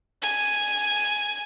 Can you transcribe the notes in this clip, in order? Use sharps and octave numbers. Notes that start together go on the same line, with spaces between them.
G#5